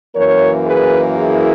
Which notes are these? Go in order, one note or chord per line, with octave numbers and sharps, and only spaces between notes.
F#2 E3 A#3 A#4 C#5
G#4 B4
E4 G#4